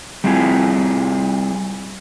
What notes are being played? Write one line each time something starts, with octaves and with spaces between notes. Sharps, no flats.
G3 C4 E4 F4 G#4